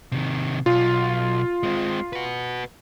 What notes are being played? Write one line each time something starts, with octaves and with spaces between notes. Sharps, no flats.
C3 D#3
B1 F4
G#3 C4
F#4 B4